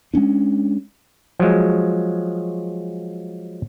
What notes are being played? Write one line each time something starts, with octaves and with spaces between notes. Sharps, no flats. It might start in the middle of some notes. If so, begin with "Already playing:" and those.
G#3 A#3 C#4 D4
F3 F#3 G#3